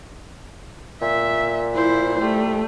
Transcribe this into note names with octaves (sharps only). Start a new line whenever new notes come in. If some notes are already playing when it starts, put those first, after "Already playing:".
A#2 E5
E4 C5
G3 A3